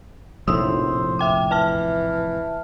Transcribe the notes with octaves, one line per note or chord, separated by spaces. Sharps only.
F1 A#1 A2 C5 D#6 E6
E5 G5 D6
E3 E5 A5 F6